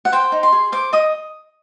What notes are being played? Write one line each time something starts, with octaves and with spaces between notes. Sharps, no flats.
F#5
C5 G5
D#4
C6
G#4
C5 D6
D#5 D#6